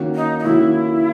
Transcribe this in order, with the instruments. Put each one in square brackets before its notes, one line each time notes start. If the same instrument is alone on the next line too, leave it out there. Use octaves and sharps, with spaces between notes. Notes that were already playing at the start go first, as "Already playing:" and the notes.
Already playing: [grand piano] D#3 A#3 C#4 F#4
[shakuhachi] D#4
D#4
[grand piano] D#3 A#3 C#4 F#4 [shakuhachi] E4